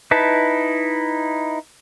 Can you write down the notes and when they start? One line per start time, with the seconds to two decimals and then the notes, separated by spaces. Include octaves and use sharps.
0.11 D#4 E4 B4 A5